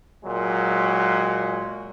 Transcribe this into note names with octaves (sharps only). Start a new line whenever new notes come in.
A#2 F#3 G#3